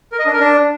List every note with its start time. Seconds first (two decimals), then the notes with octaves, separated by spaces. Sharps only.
0.12 A#4
0.19 D#5
0.26 D4
0.33 A#4
0.40 D4